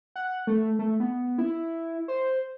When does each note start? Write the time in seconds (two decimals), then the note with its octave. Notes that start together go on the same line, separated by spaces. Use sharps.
0.16 F#5
0.47 A3
0.79 A3
1.00 B3
1.38 E4
2.08 C5